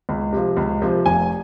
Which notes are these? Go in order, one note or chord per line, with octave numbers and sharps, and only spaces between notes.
C#2
C3 F3
C#2
C3 F3
F1 G#5